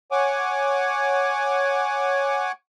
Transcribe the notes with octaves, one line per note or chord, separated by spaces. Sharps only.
C#5 F#5 G#5 D6